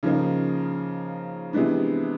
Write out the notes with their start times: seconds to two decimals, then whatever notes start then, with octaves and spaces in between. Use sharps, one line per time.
0.03 C#3 F3 A#3 D#4
1.53 C3 E3 G#3 B3 D4